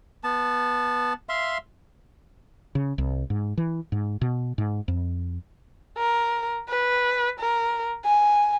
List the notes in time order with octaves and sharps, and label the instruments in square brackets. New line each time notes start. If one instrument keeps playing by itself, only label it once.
[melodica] B3 A5
E5 F5 C6
[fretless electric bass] C#3
C2
G#2
E3
G#2
B2
G#2
F2
[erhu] A#4
B4
A#4
G#5